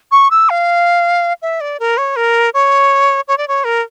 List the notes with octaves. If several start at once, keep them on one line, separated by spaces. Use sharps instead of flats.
C#6
E6
F5
E5
D5
A#4
C#5
A#4
C#5
C#5
D5
C#5
A#4